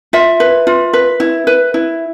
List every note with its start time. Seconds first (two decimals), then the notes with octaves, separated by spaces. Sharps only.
0.13 F4 E5
0.40 B4
0.67 F4
0.93 B4
1.20 E4
1.47 B4
1.74 E4